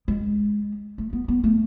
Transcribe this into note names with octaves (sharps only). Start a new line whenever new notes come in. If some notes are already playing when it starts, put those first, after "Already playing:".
G#3
A3
B3
B3
A3